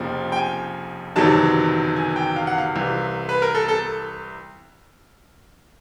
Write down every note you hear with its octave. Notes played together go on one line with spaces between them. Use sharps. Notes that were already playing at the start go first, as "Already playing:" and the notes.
Already playing: F1 F2 C#3 F3 A#3 G5
G5
G#5
F#1 E2 C3 D#3 F#3 A5
G#5
G5
F5
F#5
F5
C2 C3 E3
B4
A#4
A4
A4